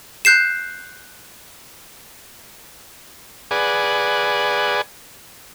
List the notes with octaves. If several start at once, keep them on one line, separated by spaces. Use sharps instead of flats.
F#6 G6 C7 E7
G#4 B4 D5 F#5 G#5